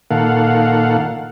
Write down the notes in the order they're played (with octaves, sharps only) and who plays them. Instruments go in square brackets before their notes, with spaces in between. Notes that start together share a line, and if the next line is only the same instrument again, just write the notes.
[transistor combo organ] A#2 D#3 A#3 A4 F5 F#5